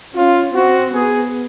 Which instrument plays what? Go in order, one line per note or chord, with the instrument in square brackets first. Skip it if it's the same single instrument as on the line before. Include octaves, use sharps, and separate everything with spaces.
[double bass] C#4 [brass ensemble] F4
[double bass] C4 [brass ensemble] F#4
[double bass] B3 [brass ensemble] G#4